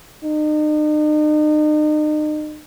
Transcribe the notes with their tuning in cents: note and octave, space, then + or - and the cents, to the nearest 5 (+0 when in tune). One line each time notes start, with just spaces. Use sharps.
D#4 -40